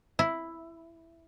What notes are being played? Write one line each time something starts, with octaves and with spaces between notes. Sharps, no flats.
E4